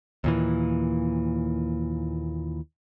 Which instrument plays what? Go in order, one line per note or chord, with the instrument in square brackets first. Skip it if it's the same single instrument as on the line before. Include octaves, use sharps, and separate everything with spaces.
[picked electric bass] D#2 A#2 E3